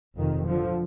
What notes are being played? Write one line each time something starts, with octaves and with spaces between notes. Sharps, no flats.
F1 F2 C3 D#3
D3 F3